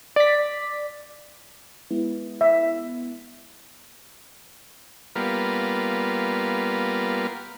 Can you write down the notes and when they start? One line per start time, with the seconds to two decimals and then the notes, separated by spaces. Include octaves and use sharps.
0.16 D5 B6
1.91 G#3 B3 E4
2.41 E5
5.16 G3 A#3 B3 F4